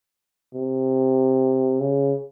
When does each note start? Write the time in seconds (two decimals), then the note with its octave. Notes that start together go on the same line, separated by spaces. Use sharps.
0.54 C3
1.80 C#3